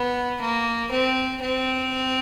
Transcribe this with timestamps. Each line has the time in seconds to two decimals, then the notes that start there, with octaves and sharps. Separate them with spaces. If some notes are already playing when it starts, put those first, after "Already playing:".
Already playing: B3
0.41 A#3
0.91 C4
1.42 C4